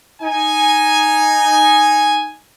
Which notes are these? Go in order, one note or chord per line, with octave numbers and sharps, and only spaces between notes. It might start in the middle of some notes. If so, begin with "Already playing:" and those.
D#4 G#5